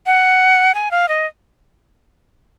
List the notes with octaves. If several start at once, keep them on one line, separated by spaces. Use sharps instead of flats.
F#5
G#5
F5
D#5